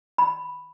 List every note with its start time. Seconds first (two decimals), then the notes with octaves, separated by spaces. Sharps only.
0.18 B5